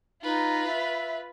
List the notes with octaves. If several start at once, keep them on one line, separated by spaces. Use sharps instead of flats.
D#4 F4 B4
E5